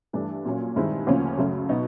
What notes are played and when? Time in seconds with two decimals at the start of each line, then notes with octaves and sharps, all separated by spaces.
0.13 G2 E3 A3 D4
0.45 A#2 F#3 A#3 C#4
0.76 G2 D#3 G#3 C4 E4
1.07 D2 C#3 F3 A#3 C#4
1.38 F#2 C#3 F#3 A3
1.69 B2 F#3 B3 D#4